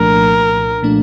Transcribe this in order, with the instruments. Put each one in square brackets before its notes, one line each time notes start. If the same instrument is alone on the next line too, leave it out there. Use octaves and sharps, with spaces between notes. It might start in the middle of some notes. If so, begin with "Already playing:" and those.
Already playing: [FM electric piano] C2 A#2 F3 A3 D4 [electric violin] A#4
[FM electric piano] A#2 F3 A3 D4